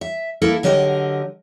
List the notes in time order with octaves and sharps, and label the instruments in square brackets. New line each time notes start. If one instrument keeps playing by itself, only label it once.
[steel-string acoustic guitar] E5
A#3 E4 A4 A#4
D3 F#3 G4 A#4 D#5